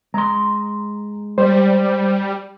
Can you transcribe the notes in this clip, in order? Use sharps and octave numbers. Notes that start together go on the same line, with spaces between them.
G#3 A#5 C6
G3 C5 D5